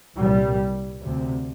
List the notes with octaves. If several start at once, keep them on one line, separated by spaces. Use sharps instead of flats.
C2 A#2 G3
D2 C3